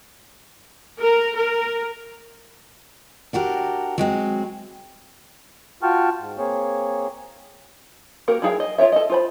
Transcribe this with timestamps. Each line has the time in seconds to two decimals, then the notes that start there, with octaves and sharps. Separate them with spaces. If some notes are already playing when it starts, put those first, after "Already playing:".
1.02 A#4
1.37 A#4
3.33 D4 F#4 G4 A#4
3.98 F#3 G#3 C4
5.83 F4 F#4 G5 A5 C#6 F6
6.19 G#2
6.38 A#3 C4 G#4 C#5
8.28 A#3 F#4 G4 A#4
8.42 F#3 E4 G#4 F5 G5
8.60 D#5
8.78 F4 A#4 C#5 E5
8.92 A4 D#5
9.10 F4 C5 B5